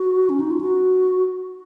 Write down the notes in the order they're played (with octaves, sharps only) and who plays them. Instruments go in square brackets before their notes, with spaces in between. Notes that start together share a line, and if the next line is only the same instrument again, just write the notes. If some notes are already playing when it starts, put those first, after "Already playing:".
Already playing: [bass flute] F#4
C#4
D#4
F4
F#4